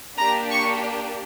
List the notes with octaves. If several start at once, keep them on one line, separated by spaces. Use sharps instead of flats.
A#3 D4 G4 A#5
C#6